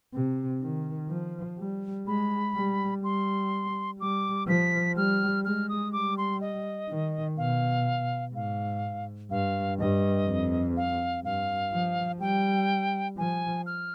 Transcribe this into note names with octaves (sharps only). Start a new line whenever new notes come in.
C3
D#3
F3
G3
G#3 B5
G3
G3 C6
G3 D6
F3 B6
G3 F6
G#3 F6
D#6
G3 D6
C6
D#5
D#3
B2 F5
G#2 F5
G2 F5
G2 D#5
F2
F5
G2 F5
F3
G3 G5
F3 G#5
F6